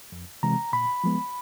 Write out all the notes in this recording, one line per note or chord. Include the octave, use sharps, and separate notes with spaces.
F2
C3 E3 G#3 C4 A#5
A#2 B5
F3 G#3 B3